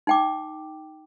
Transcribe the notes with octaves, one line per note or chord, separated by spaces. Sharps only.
D#4 G5 D6